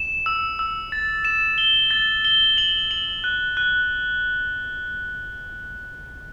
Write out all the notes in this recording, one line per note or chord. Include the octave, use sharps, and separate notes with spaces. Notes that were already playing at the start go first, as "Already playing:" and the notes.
Already playing: E7
E6
E6
A6
E7
G7
A6
G7
F#7
F#7
F#6
F#6